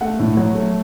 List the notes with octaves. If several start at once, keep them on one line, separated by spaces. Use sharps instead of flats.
A3 F#5
A2
F#3
A3